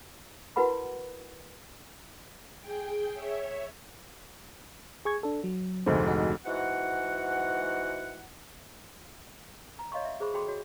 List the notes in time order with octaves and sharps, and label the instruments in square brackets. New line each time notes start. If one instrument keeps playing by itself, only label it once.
[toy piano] E4 F#4 A#4 B4 F#5 B5
[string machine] G#4 G5
C#5 E5
[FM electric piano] G#4 C#6 G#6
D4 A4
F#3
[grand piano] F1 D2 G#2 [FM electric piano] C5
[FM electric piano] D#4 F#4
[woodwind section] G#2 E3 F#4 F#5
[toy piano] A#5
C#5 D#5 F5 C6 C#6
E5
G#4 C5 B5 C#6
F#4 G#4 A4 G5 B5 C6
F#4 C#5